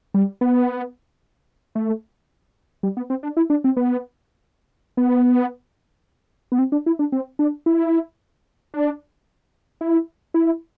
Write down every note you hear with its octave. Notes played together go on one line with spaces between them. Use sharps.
G3
B3
A3
G3
B3
C4
D4
E4
D4
C4
B3
B3
B3
C4
D4
E4
D4
C4
D4
E4
D4
E4
E4